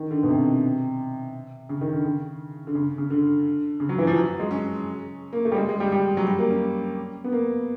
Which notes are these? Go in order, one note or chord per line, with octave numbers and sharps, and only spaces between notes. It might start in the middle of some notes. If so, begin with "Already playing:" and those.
Already playing: D#3
D3
B2
C3
C#3
D#3
D3
C#3
D3
C#3
C#3
D3
C#3
F#3
E3
F3
F#3
G#3
C#4
A#3
A3
G3
G#3
G#3
G3
G3
F#3
G3
A#3
C#4
B3
A#3